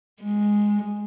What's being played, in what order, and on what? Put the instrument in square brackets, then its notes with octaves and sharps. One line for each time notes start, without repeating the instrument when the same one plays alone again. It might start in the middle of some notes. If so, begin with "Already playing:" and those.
[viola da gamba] G#3